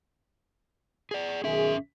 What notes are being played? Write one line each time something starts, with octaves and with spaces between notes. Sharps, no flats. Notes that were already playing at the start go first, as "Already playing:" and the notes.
G#4 D5
B1 D#3 C#4 G#4 E5